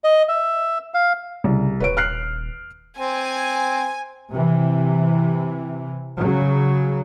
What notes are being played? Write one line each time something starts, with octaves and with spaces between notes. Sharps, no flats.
D#5
E5
F5
C2 C#3
D#1 B4 C#5 D7
F6 F#6 C7
C4 G#5
C3 E3
C#3 F#3